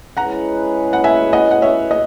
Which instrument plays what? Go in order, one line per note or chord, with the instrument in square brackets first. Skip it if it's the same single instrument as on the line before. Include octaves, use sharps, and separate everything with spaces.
[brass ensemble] G#3 C#4 E4 G#4 B4 [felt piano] F#5 A#5
[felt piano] F#5
E5 G#5
D#5 F#5
F#5
C#5 E5
D#5